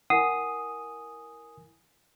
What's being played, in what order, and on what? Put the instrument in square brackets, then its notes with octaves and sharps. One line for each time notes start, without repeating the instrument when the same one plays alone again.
[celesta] E4 A#4 G#5 [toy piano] F#5 [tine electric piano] D#6